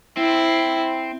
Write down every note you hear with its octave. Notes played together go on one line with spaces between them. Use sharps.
C4 E4